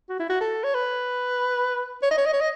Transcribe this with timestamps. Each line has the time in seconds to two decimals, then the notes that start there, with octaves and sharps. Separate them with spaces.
0.09 F#4
0.19 E4
0.29 F#4
0.41 A4
0.64 C#5
0.74 B4
2.03 C#5
2.11 D#5
2.18 C#5
2.26 D#5
2.33 C#5
2.41 D#5